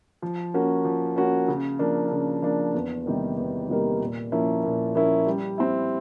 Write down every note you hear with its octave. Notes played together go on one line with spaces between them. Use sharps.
F3
A#3 C#4 F#4
F3
A#3 C#4 F#4
C#3
F3 A#3 D4
C#3
F3 A#3 D4
E2
C3 D#3 G3 A#3
E2
C3 D#3 G3 A#3
A#2
F3 A#3 C#4 E4
A#2
F3 A#3 C#4 E4
G3
C4 E4